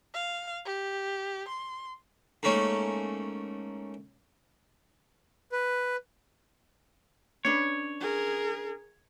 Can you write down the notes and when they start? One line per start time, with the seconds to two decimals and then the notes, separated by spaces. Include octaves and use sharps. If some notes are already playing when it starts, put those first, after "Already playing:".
0.14 F5
0.65 G4
1.48 C6
2.43 G#2 A3 A#3 C#4
5.52 B4
7.45 C#4 D4 B4 C#5
8.01 G#4 A#4